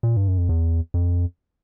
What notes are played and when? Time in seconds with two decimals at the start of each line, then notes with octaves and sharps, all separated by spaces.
0.03 A#2
0.17 G2
0.28 F#2
0.38 F2
0.49 E2
0.94 F2